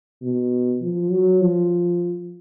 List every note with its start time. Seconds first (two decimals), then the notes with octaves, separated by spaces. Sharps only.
0.22 B2
0.81 F3
1.11 F#3
1.41 F3